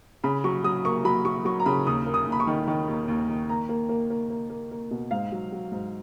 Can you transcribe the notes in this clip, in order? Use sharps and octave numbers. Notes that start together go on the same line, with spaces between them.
C#3 B5
F#3 C#6
F#3 D#6
A#3 C#6
F#3 B5
F#3 C#6
F#3 C#6
A#5
C#3 B5
D#2 D#6
A#3
D#6
D#2
B5
C#6
D#3
D#3
D#2
D#2
D#3
A#3 A#5
A#3
A#3
A#3
A#3
A#3
A#3
B2
G#2 F5
F#3
F#3
G#2